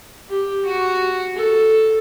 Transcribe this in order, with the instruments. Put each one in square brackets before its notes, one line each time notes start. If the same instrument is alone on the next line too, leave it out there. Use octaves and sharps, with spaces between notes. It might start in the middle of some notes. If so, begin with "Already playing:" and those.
[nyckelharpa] G4
F#4
A4